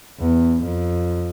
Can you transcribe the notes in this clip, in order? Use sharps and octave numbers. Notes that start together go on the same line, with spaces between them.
E2
F2